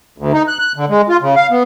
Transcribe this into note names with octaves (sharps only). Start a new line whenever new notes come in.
D2
D#4
F#6
F#6
D3
G#3
F4
C#3
F5
B3